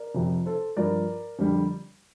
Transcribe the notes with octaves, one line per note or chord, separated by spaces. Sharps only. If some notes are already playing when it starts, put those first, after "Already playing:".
Already playing: A#4 D5
F2 C3 F3
A4 C5
G2 F3 A#4 D5
F2 D3 G3